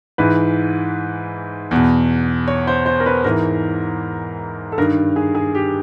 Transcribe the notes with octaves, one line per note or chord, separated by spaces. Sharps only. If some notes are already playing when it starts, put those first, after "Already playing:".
G#2 E3 B4
E2 B2
C#5
C5
C5
A#4
B4
G#2 E3 A#4
A4
G2 D#3 A#4
G#4
G#4
G4